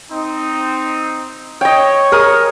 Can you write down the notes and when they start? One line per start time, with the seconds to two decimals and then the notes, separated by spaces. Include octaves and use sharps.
0.11 C4 D#4
1.61 C#5 D#5 G5
2.12 G#4 A#4 D#6